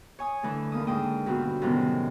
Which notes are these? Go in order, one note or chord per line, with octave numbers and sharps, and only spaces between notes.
C#5 G#5 D#6
D3 E3 A3
D#2 A#3 D#6
G#2 D3 A#3 G5 D#6
G2 B2 D3 C4 F4 F#4
F#2 A2 C3 D#3 G3 B3